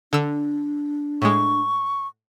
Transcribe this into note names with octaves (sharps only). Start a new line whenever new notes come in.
D3 D4 E6
A2 G#3 C#6